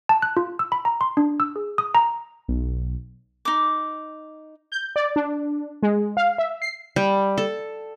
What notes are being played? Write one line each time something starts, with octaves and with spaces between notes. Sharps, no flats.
A5
F#6
F4
E6
B5
A#5
C6
D4
E6
G#4
D#6
A#5
B1
D#4 D6
G6
D5
D4
G#3
F5
E5
C7
G3
A4